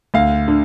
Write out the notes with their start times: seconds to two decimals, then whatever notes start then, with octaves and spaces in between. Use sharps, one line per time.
0.14 D2 F5
0.48 D3